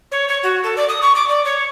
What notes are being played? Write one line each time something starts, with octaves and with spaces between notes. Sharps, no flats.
C#5
C#5
F#4
A4
D5
D#6
C#6
D6
D5
C#5